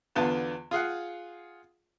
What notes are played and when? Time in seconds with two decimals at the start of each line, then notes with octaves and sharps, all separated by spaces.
0.16 E2 D3 B3 F4 A5
0.71 F4 G#4 F5 F#5